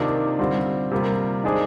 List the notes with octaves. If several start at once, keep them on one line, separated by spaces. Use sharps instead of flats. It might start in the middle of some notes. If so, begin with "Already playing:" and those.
Already playing: C3 D#3 A#3 D4 F4
D3 G3 C4 F4
C3 G3 A#3 F4
D#3 G#3 D4 G#4 C5